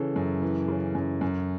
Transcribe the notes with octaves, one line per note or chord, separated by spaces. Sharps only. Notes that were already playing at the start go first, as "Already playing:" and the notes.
Already playing: C#3 E3 A4
F#2
E3
C#3
F#2
F#2